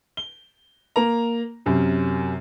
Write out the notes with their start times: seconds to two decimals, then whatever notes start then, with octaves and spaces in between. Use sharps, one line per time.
0.17 G7
0.96 A#3 A#5
1.66 F#2 C3